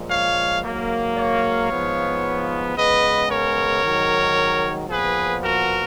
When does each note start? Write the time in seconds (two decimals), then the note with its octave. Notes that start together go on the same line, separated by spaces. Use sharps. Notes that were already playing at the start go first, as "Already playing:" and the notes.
Already playing: A#2 F3 G#3
0.11 C#5 F5
0.64 G#2 F#3 A#3
1.17 C#5 F5
1.71 G#2 F3 B3
2.76 C#3 G#3 B3 B4 D#5
3.31 A#4 C#5
3.83 G#2 D#3 F#3
4.89 A#2 F3 B3 G#4 B4
5.43 F#4 A#4